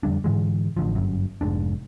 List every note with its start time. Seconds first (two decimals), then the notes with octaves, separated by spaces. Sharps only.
0.03 F2 D3 G3 D4
0.24 G#2 D3 E3 G#3
0.77 A1 D3 F3
0.95 G1 F#2
1.41 F1 G#2 D4